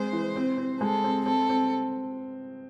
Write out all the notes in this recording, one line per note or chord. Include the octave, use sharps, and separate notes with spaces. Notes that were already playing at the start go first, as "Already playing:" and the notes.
Already playing: G#3 C4 C5
E3
C4
C4
G#3 A4
C4
C4 A4
C4